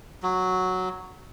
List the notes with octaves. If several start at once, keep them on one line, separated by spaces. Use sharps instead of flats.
F#3